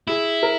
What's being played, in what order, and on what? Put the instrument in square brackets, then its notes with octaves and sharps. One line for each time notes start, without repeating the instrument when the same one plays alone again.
[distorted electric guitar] E4 [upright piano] G#4
[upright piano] A#4